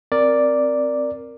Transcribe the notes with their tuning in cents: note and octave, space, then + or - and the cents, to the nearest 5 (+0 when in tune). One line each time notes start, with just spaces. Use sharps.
C4 +0 A#4 +0 D5 +0